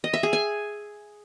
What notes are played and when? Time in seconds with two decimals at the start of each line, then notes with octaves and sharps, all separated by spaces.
0.04 D#5
0.13 E5
0.23 G#4
0.33 G#5